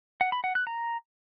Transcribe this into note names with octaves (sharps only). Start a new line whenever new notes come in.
F#5
B5
F#5
F#6
A#5